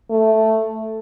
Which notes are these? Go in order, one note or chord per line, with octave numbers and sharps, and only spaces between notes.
A3